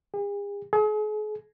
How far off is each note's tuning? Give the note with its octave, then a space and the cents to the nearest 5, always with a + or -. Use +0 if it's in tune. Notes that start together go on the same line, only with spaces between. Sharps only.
G#4 -45
G#4 +40